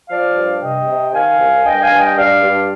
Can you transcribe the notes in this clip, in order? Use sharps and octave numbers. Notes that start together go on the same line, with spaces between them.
F3 D5 F5
G2
C3 D#5 G5
C3
D#3 F5 G#5
C2
G2 D#5 G5
F5 G#5
G2
D#5 G5
G2 D5 F5
G2